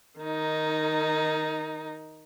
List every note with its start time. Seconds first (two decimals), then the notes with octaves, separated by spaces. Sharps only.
0.20 D#3 D#4